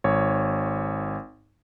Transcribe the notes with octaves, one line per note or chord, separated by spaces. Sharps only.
G#1 C#5